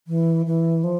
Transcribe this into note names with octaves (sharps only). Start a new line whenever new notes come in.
E3
E3
F3